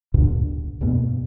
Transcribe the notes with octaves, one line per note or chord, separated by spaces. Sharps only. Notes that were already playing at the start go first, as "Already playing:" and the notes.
D2 G2 A#2 D3
E2 G2 B2 A#3